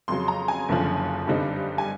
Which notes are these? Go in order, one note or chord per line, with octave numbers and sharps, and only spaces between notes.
F2 C#3 F#3 C6
A#5
G#5
F#1 F#2 D3 F3
G2 D3 G3 C4 D#4
G#5